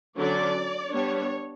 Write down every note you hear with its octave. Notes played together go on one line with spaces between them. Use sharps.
D3 F#3 C#4 D5
G3 B3 D4 C#5